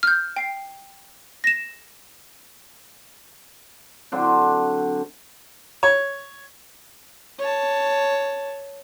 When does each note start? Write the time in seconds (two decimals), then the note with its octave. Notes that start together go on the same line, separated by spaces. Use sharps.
0.03 F6 G6
0.36 G5 C7
1.44 A#6 E7
4.12 D3 F#3 C4 D4
5.83 C#5
7.39 C#5 A5